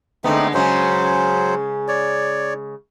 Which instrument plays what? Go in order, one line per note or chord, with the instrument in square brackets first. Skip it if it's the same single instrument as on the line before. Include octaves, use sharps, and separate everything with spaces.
[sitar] D3 G#3 B3 [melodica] A3 C4 D#4
[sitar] C#3 G#3 C#4 [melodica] F#3 C5
[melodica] C#5 D5